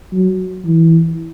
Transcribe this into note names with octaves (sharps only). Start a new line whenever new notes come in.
F#3
E3